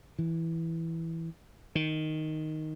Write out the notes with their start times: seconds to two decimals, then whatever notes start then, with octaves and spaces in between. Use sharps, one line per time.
0.19 E3
1.75 D#3